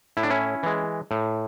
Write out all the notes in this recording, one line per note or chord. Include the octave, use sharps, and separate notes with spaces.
A2 E4
D4
C#4 E4
E3 G#3
A2